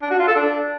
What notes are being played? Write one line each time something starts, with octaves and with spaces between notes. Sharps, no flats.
D4
F#4
F4
A4
D4